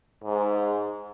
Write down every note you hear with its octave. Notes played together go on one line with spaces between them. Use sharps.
G#2